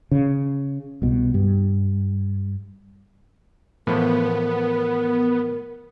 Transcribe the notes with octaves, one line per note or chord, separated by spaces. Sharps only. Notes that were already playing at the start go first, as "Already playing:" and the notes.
C#3
C2 B2
G2
A2 E3 F3 B3 A#4